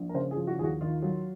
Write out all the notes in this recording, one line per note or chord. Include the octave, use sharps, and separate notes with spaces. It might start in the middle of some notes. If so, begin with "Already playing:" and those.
Already playing: A#1
A#4
C#3 C5
G#4
F3
F#4
D#2 G#4
F#4
D#3 F4
F#3